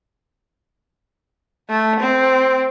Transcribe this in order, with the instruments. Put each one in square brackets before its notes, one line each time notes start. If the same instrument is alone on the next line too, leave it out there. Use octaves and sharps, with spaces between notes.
[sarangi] A3
C4